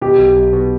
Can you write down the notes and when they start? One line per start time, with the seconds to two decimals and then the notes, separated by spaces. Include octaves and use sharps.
0.01 B2 G4
0.18 B1
0.35 B1
0.53 B2